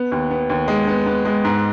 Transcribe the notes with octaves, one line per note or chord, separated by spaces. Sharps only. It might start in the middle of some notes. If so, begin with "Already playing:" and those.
Already playing: B3
D#2
B3
D#2
G#3
B3
B3
G#3
G#2